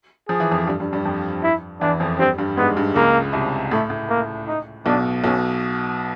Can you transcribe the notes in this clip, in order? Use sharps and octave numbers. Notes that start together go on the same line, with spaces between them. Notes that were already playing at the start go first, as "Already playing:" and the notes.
F3 G#4
E3
F2 F3
G2 G3
G2 G3
G2 G3
F2 F3
E4
E2 E3 D4
F2 F3
G2 G3 C4
G2 G3
G#2 G#3 B3
G2 G3
C#2 C#3 A#3
C2 C3
A2 A3
A2
A#3
D#4
B1 B2 D4
B1 B2 C#4